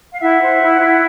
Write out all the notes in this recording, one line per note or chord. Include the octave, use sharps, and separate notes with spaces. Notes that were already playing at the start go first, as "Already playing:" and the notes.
F5
E4 E5 F#5
C5
E4
E4